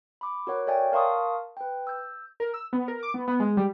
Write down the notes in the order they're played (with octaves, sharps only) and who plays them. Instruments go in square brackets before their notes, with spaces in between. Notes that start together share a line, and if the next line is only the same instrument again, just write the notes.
[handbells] B5 D6
F#4 A#4 C#5 F#5
A4 C#5 D5 E5 G5 G#5
A#4 F5 A5 C6 C#6 D#6
B4 G5
E6 G6
[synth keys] A#4
E6
B3
A#4
D6
B3
B3
G#3
G3